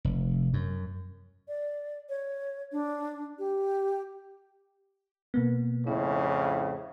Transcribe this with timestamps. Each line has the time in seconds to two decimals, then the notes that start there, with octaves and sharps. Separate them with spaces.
0.05 F1
0.53 F#2
1.48 D5
2.09 C#5
2.72 D4
3.39 G4
5.34 B2 A#3 B3
5.87 F2 A2 C#3 E4